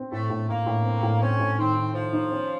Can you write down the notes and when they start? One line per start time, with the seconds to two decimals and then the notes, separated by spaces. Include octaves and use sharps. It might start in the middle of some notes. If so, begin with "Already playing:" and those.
Already playing: C4
0.11 A2 A3
0.30 A2
0.48 A2 A#3
0.66 A2
0.85 C4
1.03 A2
1.21 C4 C#4
1.40 A2
1.58 D#3 C4
1.76 D#3
1.94 D#3 F3
2.13 D#4
2.31 C#4